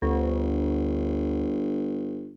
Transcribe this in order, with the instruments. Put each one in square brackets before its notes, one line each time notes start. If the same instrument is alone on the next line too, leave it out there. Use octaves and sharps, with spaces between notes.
[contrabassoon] G1 [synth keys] D2